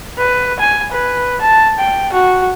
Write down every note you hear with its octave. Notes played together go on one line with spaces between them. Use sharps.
B4
G#5
B4
A5
G5
F#4